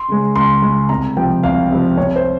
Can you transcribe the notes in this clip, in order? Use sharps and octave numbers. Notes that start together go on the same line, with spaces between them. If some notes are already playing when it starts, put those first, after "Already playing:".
Already playing: C6
C#3 G#3
C#2 C6
C#3 G#3
C2 A#5
C3 F3 G5
C2 F5
C3 F3
C2 C#5
C5